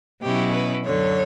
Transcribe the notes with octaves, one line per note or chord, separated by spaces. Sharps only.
B2 F#3 C#4 E4 G4
B4
F#2 D3 F#3 C#5